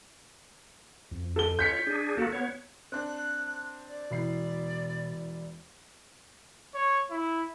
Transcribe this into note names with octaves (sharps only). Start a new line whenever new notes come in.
F2
A4 G7
F4 C#5 G6 B6 C#7
D4 G#4
A#3 F#4 A4
B3 C#5
C4 D4 F#6
D5
E1 B2 E4 C7
C#5
E4